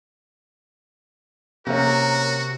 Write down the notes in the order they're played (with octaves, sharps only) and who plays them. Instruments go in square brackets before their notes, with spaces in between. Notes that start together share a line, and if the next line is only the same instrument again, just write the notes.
[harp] C3 [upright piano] A#3 C#4 [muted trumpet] F#4 [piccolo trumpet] A#4